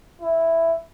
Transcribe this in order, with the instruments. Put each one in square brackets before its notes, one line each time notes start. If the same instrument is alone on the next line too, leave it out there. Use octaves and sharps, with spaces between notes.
[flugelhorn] E4